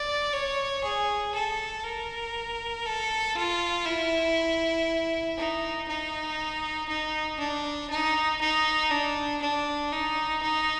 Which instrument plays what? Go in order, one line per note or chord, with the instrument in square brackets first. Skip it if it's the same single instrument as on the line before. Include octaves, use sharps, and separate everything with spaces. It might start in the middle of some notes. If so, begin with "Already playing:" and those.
Already playing: [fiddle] D5
C#5
G#4
A4
A#4
A4
F4
E4
D#4
D#4
D#4
D4
D#4
D#4
D4
D4
D#4
D#4